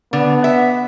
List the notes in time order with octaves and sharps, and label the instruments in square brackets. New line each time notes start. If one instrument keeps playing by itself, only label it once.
[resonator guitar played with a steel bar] D3 [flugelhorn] B3
[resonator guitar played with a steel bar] E5 F#5